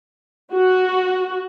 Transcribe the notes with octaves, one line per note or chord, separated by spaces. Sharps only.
F#4